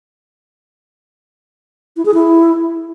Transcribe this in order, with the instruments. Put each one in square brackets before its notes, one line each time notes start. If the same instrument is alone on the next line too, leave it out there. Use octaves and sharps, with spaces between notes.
[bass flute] E4
G#4
E4